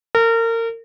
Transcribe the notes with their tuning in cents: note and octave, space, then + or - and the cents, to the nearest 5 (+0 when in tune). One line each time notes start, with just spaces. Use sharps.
A#4 -30